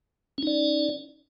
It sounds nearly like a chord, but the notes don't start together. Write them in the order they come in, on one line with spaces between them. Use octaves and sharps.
C#4 D#4 D5